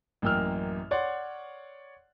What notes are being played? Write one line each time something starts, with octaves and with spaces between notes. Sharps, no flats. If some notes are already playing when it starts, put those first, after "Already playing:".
A1 F#2 A#3 G5 E6 F6
C#5 D5 F#5 C6